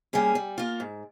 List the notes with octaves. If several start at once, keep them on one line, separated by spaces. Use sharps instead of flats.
G3 A#3 C#4 G#4
G3
A#3 F4
G#2